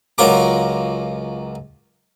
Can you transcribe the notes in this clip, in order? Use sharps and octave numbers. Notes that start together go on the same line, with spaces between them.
C#2 F#3 F4 A#4 A#5 D6